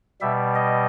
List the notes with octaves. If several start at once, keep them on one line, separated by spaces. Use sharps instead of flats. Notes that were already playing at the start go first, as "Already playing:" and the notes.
B2 G3 E5
D#5